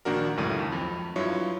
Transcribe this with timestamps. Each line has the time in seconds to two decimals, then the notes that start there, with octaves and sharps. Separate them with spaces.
0.05 A#1 D#3 A#3 D4 F#4 A#4
0.37 C#2 F#2 A2 D#7
0.59 D#2
0.72 F2
1.16 G2 F#3 E4 F4 C#5